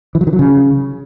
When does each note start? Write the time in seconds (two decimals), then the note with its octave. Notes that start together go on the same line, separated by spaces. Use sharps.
0.15 E3
0.21 F#3
0.27 D#3
0.33 F#3
0.39 C#3